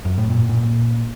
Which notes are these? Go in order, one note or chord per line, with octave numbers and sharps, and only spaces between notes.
F#2
A2
A#2
A#2